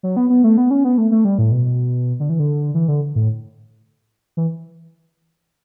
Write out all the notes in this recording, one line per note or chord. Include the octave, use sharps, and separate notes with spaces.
F#3
B3
B3
A3
B3
C#4
B3
A3
A3
G3
A2
B2
D3
E3
D3
E3
D3
A2
E3